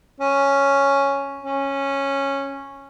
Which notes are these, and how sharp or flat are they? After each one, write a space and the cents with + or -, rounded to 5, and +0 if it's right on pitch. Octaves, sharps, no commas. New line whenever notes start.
C#4 +0
C#4 -10